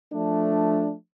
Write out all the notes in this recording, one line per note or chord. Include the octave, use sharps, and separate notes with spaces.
F3 A3 D4